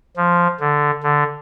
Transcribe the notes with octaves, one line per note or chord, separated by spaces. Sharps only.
F3
D3
D3